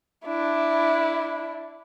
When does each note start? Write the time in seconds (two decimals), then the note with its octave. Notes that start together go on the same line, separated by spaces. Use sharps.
0.25 D4 E4